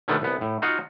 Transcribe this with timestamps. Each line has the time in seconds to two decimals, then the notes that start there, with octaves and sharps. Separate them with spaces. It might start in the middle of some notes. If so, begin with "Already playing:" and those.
0.08 B2 D3 D#3 G3 A3 B3
0.22 C2 B3
0.41 A2
0.62 D#4 F4 F#4 D#5 F5